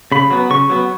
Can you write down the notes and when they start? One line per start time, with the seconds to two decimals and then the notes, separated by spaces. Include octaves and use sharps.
0.12 C#3 B5
0.31 F#3 B3
0.50 C#3 C#6
0.69 F#3 B3